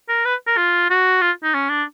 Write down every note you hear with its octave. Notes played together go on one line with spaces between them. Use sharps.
A#4
B4
A#4
F4
F#4
F4
D#4
C#4
D4